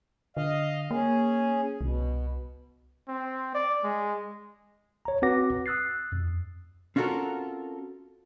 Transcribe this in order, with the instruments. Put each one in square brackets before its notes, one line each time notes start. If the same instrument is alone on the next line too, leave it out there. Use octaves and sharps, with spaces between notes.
[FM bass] D3 [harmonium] D#5 F5
[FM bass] A#3 [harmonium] C#4 G#4
[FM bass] C2 [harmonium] B2
[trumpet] C4
D5
G#3
[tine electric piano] C#5 A#5
C4 F#4 B4 F#5 D6 A#6
D#6 E6 F#6 A6 C7
F2
[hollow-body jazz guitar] C4 C#4 F4 F#4 A4 A#4